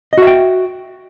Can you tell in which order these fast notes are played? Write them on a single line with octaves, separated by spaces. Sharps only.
D#5 F#4 E5 G5